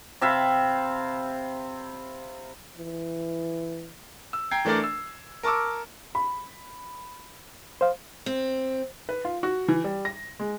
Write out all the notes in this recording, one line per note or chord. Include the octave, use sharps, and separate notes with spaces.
C3 E5 F5 B5
E3
E6
G5 A#5 G#6 C7
E3 A3 D4 A#4 D5
E6
A#4 A5 C#6 D6 E6
B5
C5 F5
C4
B4
F4
F#4
E3
G3
A#6
G#3